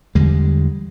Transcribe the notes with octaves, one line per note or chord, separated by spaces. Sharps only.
E2 D3 G3 G#3